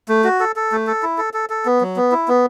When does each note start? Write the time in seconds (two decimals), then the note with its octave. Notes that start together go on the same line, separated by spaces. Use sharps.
0.08 A3
0.24 F#4
0.40 A4
0.56 A4
0.72 A3
0.87 A4
1.03 E4
1.18 A4
1.34 A4
1.50 A4
1.65 B3
1.81 F#3
1.96 B3
2.12 E4
2.28 B3